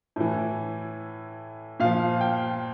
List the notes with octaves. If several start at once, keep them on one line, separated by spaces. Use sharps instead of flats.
A2 E3
A#2 F3 F5
G5